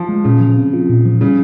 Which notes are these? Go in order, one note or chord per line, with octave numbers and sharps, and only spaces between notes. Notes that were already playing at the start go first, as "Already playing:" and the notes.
Already playing: F3
G#3
A#2 C#3
F3
C4
F4
A#2
F3
C#3 G3